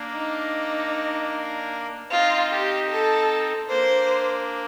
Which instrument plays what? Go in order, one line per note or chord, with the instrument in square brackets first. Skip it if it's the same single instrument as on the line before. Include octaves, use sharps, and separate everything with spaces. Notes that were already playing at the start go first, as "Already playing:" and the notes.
Already playing: [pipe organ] A#3 D4
[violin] D#4
[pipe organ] C4 D#4 [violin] F4
[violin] G4
A4
[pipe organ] A#3 D4 [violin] C5